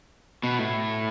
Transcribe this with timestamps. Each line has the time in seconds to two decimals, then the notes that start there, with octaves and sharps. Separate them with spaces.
0.44 B2
0.59 A2